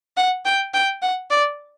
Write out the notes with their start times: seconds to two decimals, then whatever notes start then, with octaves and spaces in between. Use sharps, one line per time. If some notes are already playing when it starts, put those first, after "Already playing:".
0.17 F#5
0.45 G5
0.74 G5
1.02 F#5
1.31 D5